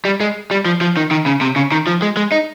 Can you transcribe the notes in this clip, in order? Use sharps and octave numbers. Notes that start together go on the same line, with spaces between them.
G3
G#3
G3
F3
F3
D#3
D#3
C#3
C3
C#3
D#3
F3
G#3
G#3
D#4